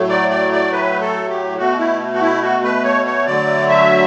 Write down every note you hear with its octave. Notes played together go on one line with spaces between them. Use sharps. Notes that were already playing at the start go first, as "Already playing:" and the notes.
Already playing: A2 F#3 A3
D5
D5
D5
B4
A4
G4
B2 A3 F#4
E4
F#4
E4
F#4
B4
C#5
C#5
D3 F#3 A3 D5
E5